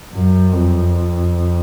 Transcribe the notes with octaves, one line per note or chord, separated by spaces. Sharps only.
F#2
F2